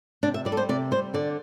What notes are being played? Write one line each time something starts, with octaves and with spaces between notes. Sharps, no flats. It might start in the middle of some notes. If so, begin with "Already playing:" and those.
C3 D4
E5
G3 D5
A4
C5
C3 D5
G3 C5
D3 D5